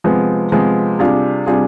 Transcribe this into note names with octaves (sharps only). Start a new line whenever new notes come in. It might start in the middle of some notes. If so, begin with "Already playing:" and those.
C3 F3 G#3 B3
C3 F3 G#3 B3
C3 G3 D4 F4 G#4
C3 G3 D4 F4 G#4